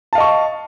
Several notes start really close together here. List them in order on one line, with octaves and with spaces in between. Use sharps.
A5 F5 D#5 C#6